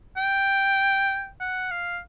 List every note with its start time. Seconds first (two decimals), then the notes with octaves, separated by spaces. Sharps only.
0.17 G5
1.40 F#5
1.71 F5